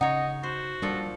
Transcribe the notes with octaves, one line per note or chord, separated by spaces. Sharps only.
C#3 D#4 C#5 D#5 F#5
F#4 C5
A#2 F3 G3 D4 A4